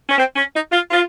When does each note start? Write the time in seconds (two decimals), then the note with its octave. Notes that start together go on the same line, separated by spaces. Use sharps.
0.09 C#4
0.18 C4
0.36 C#4
0.54 D#4
0.72 F4
0.91 F4